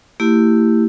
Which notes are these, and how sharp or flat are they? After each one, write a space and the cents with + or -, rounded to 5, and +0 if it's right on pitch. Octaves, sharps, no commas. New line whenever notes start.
A3 +40 E4 +0 G4 +0